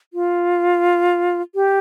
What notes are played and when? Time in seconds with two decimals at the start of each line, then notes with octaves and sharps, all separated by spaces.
0.13 F4
1.55 G4